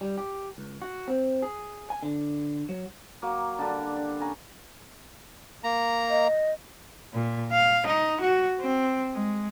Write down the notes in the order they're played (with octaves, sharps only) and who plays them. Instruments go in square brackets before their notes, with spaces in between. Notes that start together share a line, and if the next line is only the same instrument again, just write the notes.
[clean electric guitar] G3
G4
C#2
F#4
C4
G#4
G#5
D3
F#3
[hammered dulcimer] F#3 A#3
D3 G3 D4
G4
D4
C#4 G#5 A#5 C#6
[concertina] A#3 A#5
[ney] D#5
[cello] A#2
F5
D#4
F#4
C4
G#3